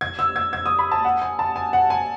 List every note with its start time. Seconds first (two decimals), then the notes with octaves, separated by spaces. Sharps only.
0.01 G#6
0.19 E6
0.36 G#6
0.53 G#6
0.66 D#6
0.79 B5
0.92 A5
1.04 F#5
1.22 G#5
1.39 A5
1.56 G#5
1.73 F#5
1.90 G#5